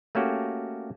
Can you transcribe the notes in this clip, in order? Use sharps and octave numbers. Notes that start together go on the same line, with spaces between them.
A3 A#3 C#4 F#4 G4